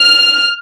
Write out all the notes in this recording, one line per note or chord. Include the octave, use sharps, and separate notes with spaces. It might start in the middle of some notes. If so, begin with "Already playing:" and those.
Already playing: F6